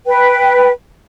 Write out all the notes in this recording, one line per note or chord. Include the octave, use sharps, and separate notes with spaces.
B4 G5